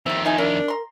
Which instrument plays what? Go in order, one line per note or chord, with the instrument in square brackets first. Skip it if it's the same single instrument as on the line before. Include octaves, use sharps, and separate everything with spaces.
[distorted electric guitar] F2 D#3 [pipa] G3 C5 [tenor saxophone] E5
[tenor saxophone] D#4 [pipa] E4 E5 G#5
[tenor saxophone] D4 [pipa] E4 [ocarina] A#4
[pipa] A#5 C6